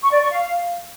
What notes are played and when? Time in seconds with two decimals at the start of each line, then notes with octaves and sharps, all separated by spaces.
0.03 C#6
0.12 D5
0.22 C#6
0.31 F5